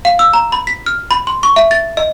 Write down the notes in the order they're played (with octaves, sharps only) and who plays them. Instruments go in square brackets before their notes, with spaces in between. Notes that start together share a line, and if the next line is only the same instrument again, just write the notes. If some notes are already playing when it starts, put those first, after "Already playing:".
[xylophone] F5
E6
A#5
B5
B6
F6
B5
C6
C#6
E5
A6
D#5